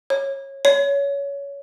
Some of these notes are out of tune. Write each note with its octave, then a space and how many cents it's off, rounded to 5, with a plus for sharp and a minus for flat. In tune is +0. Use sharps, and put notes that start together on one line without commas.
C#5 -20
C#5 +20